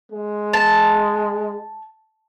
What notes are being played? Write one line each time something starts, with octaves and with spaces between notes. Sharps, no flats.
G#3
A5